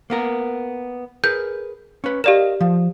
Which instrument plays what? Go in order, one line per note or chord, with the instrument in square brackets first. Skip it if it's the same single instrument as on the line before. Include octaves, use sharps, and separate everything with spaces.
[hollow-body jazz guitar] A#3 B3 A#4
[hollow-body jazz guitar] G#4 A#4 B4 [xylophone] G6
[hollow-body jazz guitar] C#4 B4
[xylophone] G4 D5 E7 [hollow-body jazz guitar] A#4 D#5 F5
[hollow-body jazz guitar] F3